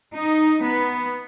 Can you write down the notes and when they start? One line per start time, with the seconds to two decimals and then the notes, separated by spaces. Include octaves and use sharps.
0.14 D#4
0.63 B3